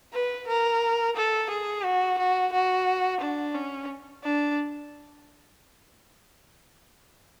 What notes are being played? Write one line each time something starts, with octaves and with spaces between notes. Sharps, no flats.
B4
A#4
A4
G#4
F#4
F#4
F#4
D4
C#4
D4